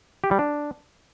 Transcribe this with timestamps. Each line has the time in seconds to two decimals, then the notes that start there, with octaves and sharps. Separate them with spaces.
0.24 G4
0.31 G3
0.39 D4